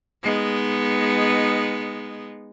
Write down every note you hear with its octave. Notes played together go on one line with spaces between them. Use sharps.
G#3 B3 D#4